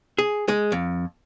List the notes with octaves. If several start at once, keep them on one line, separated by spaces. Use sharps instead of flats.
G#4
G#3
F2